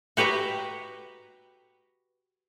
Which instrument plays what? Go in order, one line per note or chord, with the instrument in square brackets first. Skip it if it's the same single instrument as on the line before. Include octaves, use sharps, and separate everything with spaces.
[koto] F#4 G4 B4 E5 A#5